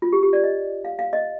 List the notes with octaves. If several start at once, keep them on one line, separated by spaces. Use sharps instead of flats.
F4
G4
G4
D5
D#5
F5
F5
D#5